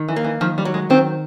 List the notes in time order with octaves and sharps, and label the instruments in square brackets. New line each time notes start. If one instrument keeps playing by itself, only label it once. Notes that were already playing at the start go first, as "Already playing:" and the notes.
Already playing: [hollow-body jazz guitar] D#3
[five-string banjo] E3
[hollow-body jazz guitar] A#3
[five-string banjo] E3
[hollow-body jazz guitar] D#3 [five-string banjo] F3
[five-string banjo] G3
[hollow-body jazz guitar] F#3
[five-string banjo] G#3
[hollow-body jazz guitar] D#3 [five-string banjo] C4